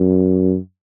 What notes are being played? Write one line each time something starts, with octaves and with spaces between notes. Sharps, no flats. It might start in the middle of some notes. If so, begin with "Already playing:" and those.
Already playing: F#2